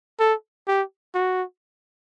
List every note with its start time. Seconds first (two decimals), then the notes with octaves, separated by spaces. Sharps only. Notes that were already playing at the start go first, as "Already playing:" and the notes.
0.20 A4
0.67 G4
1.14 F#4